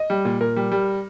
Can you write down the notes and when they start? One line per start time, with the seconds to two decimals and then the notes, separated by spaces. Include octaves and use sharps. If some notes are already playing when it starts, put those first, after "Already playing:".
Already playing: D#5
0.10 G3
0.25 A#2
0.40 A#2 A#4
0.56 G3
0.71 G3